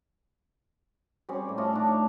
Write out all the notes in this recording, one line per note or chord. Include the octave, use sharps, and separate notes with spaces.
G3 C4 C#4 G#4
A2 D6
A3 F4 C#5 D#5
D4 D#4
C#5